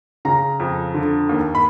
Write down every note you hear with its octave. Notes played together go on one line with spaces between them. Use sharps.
C#3 A#5
F2
D3
D#2
B5